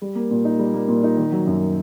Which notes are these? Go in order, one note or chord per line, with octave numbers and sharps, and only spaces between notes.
G3
A#3
A#2
D#4
G3
A#3
A#2
D#4
D#3
F#3
F#2